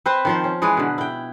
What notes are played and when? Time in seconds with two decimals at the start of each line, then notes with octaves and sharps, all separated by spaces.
0.06 C4 B4 C5
0.25 D#3 F3 C5
0.44 C#4
0.62 E3 G#3 G#4 B4
0.77 B2 D3
0.98 E4 G5